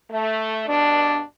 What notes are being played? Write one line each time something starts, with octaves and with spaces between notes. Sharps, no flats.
A3
G2 B2 D4